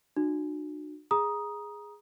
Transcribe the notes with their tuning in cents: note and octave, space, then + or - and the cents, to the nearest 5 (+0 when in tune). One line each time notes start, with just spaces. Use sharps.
D4 +40 F#4 -20
G#4 +0 A#5 +25 D#6 +0